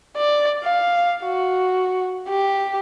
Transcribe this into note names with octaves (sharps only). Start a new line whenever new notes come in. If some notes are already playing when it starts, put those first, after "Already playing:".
D5
F5
F#4
G4